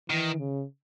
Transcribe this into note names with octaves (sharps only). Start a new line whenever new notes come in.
D#3 E3
C#3